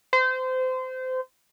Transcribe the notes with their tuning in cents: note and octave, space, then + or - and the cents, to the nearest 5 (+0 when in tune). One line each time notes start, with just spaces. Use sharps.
C5 -25